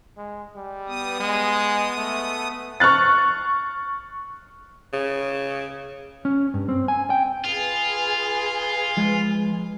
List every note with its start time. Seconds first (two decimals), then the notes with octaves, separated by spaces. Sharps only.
0.17 G#3
0.56 G3
0.88 B3 D#6
1.20 G#3
1.97 A3
2.80 C#6 F6 F#6 A6
4.93 C#3
6.25 C#4
6.54 G2
6.69 C4
6.88 G#5
7.10 G5
7.45 F4 G#4 B4 G#5
8.97 F3 G#3